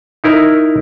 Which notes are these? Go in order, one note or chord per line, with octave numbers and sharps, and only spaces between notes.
D#4 E4 A#4